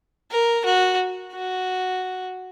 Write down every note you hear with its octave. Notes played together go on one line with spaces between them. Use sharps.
A#4
F#4
F#4